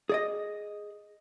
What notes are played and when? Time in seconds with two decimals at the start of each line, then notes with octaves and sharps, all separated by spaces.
0.09 G#4 D5 D#5